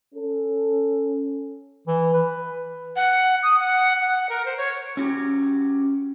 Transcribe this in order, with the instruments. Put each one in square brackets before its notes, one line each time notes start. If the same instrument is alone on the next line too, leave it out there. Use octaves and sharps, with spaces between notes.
[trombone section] C#4 A4
[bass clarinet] E3
B4
[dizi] F#5
D#6
F#5
F#5
A#4
C5
C#5
[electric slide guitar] C#4 F#4 G4